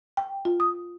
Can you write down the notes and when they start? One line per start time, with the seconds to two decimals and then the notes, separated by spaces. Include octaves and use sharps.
0.17 G5
0.45 F4
0.60 D#6